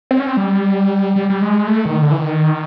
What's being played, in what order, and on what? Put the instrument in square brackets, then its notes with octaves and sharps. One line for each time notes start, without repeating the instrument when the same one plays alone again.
[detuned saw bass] C4
C#4
C4
G3
G3
G3
G#3
A3
D#3
D3
E3
D#3